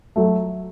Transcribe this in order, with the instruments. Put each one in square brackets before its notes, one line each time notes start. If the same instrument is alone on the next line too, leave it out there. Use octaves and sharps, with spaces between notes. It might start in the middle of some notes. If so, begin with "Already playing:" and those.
[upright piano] F#3 A3